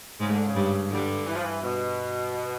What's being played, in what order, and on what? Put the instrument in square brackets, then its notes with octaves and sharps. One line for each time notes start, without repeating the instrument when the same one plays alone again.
[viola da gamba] G#2 G#3 [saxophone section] C#3
[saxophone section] D3
C#3
[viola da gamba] G2 G3
[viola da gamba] G2 G3 [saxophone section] D3
[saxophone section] E3
F3
E3
B2